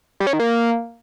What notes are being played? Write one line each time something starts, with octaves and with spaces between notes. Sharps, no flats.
G3
C#4
D#3
A#3